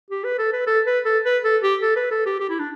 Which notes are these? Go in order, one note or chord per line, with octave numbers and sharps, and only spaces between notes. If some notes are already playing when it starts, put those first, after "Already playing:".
G4
B4
A4
B4
A4
B4
A4
B4
A4
G4
A4
B4
A4
G4
G4
E4
D4